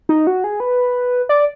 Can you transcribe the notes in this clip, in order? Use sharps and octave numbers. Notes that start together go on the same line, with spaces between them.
D#4
F#4
G#4
B4
D5